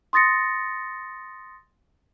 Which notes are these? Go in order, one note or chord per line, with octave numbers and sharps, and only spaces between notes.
C6 D#6 A6 A#6 C#7